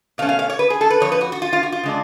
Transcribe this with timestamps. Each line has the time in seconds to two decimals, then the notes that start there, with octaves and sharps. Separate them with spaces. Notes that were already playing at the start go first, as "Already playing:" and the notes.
0.18 B2 A3 C#4 F5
0.29 F5
0.39 F5
0.50 C#5
0.59 B4
0.70 G#4
0.81 A4
0.90 B4
1.00 F2 F3 C#5
1.12 B4
1.21 F#4
1.32 F#4
1.42 F4
1.53 F4
1.63 F#4
1.72 F4
1.83 C#3 G#3 D4